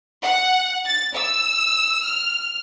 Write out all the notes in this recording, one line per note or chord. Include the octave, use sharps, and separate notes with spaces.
F#5
A6
E6
F6